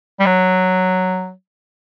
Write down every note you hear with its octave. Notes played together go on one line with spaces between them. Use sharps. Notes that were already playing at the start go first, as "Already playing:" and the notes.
G3
F#3